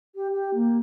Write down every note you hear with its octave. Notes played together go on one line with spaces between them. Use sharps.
G4
G4
A#3